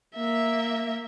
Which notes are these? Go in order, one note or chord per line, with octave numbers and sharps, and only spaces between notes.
A#3 E5